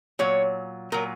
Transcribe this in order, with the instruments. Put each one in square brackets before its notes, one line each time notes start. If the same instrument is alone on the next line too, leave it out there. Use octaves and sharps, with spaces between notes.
[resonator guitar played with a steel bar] A#2 F#3 C#5
A#2 F#3 A#4